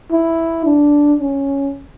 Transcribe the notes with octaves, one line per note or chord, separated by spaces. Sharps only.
E4
D4
C#4